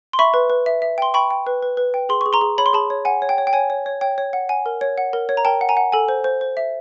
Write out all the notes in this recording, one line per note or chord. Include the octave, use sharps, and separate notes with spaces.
C6
E5 B5 C#6
B4
B4
E5
E5
G5 C6
G5 B5 C#6
G5
B4
B4
B4
G5
G#4 C6
G#4 C#6
A#5 C6
G#4
C#5 B5
C6
G#4 A5 B5
C#5
F#5 G#5
C#5
G5
C#5
G5
C#5 G#5
C#5
C#5
C#5 G5
C#5
F#5
F#5 G#5
A#4
C#5
F#5
A#4
C#5
A#5
A#4 G5 A5
F#5
G#5 A#5
F#5
A4 G#5
C5
C5
C5
E5